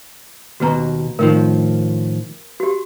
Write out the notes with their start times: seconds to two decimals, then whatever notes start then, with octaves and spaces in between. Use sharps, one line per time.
0.60 D#2 B2 F#4 B4 A#5
1.19 A2 D#3 F3 A#4
2.60 F#4 G4